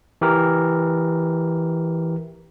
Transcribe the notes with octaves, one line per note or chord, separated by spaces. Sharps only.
E3 G4 A#4